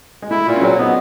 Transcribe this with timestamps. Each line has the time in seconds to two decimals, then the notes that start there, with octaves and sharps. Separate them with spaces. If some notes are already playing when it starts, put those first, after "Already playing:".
0.22 G#3
0.31 A3 E4
0.47 A#2
0.56 C#4
0.62 F#3 C4
0.78 B3 D#4